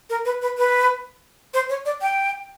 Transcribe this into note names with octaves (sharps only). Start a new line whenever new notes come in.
A#4
B4
B4
B4
C5
C#5
D5
G5